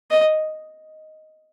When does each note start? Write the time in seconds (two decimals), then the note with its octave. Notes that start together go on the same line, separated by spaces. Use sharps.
0.11 D#5